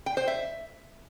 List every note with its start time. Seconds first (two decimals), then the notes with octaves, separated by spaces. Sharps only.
0.06 G5
0.17 C5
0.28 E5